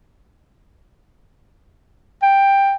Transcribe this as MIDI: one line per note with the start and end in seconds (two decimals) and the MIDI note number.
2.23 2.75 79